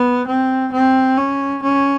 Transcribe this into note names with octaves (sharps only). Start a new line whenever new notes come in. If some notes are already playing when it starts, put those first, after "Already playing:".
Already playing: B3
C4
C4
C#4
C#4